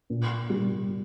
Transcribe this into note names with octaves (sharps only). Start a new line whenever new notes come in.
A#2
G3